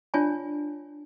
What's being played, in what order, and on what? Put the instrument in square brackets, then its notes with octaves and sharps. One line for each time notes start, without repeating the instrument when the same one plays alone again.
[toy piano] D4 F4 C#5 D5 G#5 A5